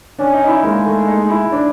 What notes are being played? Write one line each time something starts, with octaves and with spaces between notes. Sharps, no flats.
C#4 D4
D#4
D#4
E4
G#3 A#3
A3
D#4
E4
D4